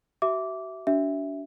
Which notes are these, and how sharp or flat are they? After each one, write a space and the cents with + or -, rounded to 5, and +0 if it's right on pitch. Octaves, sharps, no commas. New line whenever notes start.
F#4 +40 E5 +0 D6 -15
D4 -35 F#4 +30 E5 +0